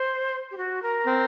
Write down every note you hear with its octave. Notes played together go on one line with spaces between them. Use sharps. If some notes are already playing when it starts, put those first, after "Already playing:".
Already playing: C5
G4
F#4
A#4
C4